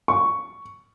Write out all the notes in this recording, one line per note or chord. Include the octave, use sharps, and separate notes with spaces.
C#6